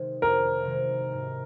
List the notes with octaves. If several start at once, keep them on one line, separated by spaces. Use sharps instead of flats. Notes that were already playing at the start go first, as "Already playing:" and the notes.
Already playing: C3 D#3 G#3
F2 A#4
C3 D#3 G#3
G#2